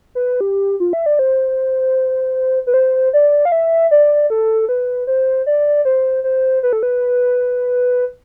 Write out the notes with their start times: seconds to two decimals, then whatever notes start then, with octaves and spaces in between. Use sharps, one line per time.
0.15 B4
0.41 G4
0.80 F4
0.93 E5
1.06 D5
1.19 C5
2.67 B4
2.74 C5
3.13 D5
3.45 F5
3.52 E5
3.91 D5
4.30 A4
4.69 B4
5.07 C5
5.46 D5
5.85 C5
6.24 C5
6.63 B4
6.73 A4
6.83 B4